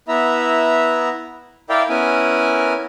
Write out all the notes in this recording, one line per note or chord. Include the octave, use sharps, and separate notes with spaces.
B3 E4 E5 A#5
E4 A#4 D5 E5 F5 G5
B3 C#4 E4 A#4 G#5